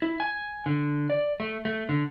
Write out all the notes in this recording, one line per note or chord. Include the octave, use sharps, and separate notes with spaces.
E4
G#5
D3
D5
A3
A3
D3